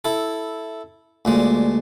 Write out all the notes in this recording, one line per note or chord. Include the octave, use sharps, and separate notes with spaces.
E4 A4
D2 A#2 G#3